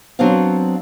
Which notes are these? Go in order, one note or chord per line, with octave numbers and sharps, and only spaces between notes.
F#3 B3 C4 D4 C5 F5